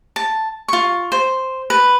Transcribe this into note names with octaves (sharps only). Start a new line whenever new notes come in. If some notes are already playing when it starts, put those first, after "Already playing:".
A5
F4 C#6
C5
B4